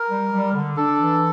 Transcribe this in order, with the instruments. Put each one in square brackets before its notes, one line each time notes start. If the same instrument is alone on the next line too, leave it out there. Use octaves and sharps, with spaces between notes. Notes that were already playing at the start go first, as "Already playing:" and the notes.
Already playing: [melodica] A#4
[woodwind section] G3
G3
D3
[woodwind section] D4 [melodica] A4
[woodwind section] E3